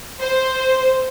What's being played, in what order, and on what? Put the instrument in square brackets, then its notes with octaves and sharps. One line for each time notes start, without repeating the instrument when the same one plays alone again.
[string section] C5